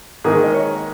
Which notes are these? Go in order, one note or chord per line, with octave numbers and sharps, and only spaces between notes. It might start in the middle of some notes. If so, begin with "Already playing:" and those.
G#2 D#3 A#3 D#4 G#4
D#5
C#5